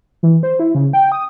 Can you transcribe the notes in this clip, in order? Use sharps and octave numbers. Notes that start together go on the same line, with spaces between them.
E3
C5
E4
C#3
G5
D#6